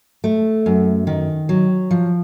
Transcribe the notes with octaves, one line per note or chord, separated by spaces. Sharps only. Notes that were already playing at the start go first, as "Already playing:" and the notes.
A3
F#2
D#3
F#3
F3